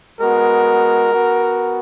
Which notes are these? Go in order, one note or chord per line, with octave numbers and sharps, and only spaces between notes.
G#3 B3 F#4 A#4
B3 F#4